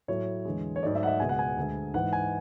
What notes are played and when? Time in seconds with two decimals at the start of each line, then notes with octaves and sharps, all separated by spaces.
0.08 A2 F#3 A3 C#5
0.45 E2 D3 G#3
0.76 C#5
0.83 G#2 F#3 A3 D5
0.95 E5
1.03 F#5
1.07 E5
1.20 C#2 B2 G#3 G#5
1.29 F#5
1.39 G#5
1.57 D2 D3 G#3
1.94 G#2 E3 G#3 F#5
2.13 G#5